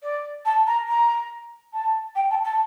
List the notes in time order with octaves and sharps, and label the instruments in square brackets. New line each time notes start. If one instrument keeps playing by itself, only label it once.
[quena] D5
A5
A#5
A#5
A5
G5
A5
A5